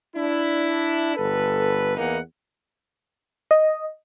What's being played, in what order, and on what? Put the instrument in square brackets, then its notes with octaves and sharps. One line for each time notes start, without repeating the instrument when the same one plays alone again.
[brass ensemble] D4 E4
G1 A4 B4
E2 E3 A#3 D#4 F#5
[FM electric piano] D#5